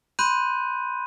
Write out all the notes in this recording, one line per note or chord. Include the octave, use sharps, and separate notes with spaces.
B5 C6 F#6 G6 D#7